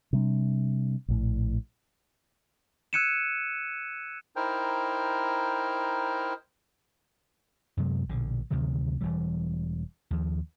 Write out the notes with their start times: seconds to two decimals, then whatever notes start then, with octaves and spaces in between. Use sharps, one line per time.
0.13 C3 G3 D4
1.08 A#1 A2
2.93 E6 F#6 G#6 C#7 D#7 E7
4.36 D#4 E4 A#4 C5 G5
7.77 F#2 C3 F#3 G#3
8.09 A#1 B2 D3
8.51 D2 C3 D#3 F#3
9.01 E1 E3 G3
10.11 D#2 F3